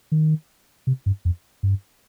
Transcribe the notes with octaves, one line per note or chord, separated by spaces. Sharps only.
D#3
C3
G2
F2
G2